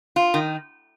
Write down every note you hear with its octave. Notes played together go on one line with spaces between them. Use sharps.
F4
D#3